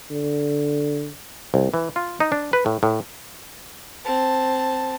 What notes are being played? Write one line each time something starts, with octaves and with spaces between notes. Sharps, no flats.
D3
C2
E3
F4
D#4
D4
B4
A2
A2
C4 A5